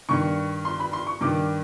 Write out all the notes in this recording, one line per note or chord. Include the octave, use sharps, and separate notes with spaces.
G2 D#3 C#6
C6
B5
C6
C#6
G2 D#3 D6